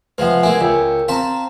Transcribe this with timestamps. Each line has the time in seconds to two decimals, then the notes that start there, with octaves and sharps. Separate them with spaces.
0.18 C3 F3 G#3 B4 F#5
0.43 G#3 A#3 E4 G#5
0.61 C#2 A#4 G5
1.08 C4 C5 F5 A5 A#5